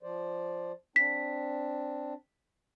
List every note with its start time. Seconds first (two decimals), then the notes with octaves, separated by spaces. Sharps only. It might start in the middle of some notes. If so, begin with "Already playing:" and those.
0.03 F3 C5 D5
0.96 C4 D4 B6